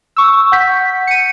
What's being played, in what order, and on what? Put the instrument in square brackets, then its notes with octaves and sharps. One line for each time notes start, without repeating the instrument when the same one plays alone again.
[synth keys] C#6 E6
F#5 G6 B6
C#7 D#7